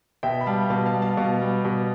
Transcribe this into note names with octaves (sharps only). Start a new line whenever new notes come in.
B2 E5 G5
B5
G3 F5 A5
B2 F5 A5
F5 A5
G3
F5 A5
B2 F5 A5
G3
B2